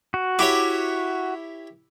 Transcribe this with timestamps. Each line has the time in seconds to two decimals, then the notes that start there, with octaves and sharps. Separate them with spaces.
0.14 F#4
0.39 E4 G4 C#5 D6